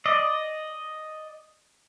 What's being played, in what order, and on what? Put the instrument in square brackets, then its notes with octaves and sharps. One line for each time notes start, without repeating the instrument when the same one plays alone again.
[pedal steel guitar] D5 D#5